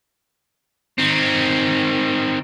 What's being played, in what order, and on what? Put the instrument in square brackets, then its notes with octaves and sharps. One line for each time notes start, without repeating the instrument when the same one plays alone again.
[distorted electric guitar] D#3 C4